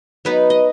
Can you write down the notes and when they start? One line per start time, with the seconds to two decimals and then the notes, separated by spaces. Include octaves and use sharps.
0.25 F#3 B3 D#4 B4
0.50 D#5